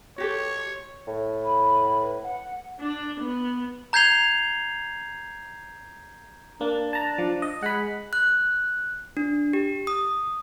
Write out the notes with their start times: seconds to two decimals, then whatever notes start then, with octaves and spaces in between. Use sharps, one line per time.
0.18 F#4 G4 A4 C#5
1.08 A2
1.44 B5
2.01 B4
2.23 F#5
2.80 D4
3.20 B3
3.93 A#5 G6 G#6 C7 F7 G7
6.61 A#3 D4
6.93 A5 A#5
7.18 F3
7.42 D#5
7.63 G#3 F#5 B5
8.13 F#6
9.17 D4
9.53 G4
9.87 D#6